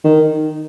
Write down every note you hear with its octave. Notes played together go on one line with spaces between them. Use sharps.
D#3